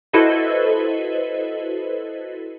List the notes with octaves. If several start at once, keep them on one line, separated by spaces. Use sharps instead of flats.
E4 F#4 A4 B4 C5 D#5